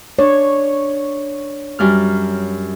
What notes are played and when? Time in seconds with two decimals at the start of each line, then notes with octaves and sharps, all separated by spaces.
0.19 D4 C#5
1.79 F#2 G3 F6